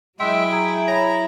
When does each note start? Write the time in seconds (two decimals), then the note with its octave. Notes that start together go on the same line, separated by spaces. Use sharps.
0.20 F#3 G#3 E4 E5 G5 C6
0.52 G#4 A#5
0.88 C#5 A#5 B5